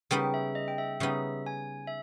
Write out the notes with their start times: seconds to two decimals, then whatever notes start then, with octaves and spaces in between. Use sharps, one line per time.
0.11 C#3 G3 B3 D#4 G5
0.34 E5
0.55 D#5
0.68 G5
0.78 E5
1.00 C#3 G3 B3 D#4 E5
1.46 G#5
1.87 E5